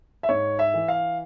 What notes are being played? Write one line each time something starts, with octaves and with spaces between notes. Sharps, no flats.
E5
G#2 C#5
E5
E3
F5